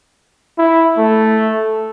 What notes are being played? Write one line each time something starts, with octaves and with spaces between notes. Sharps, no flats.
E4
A3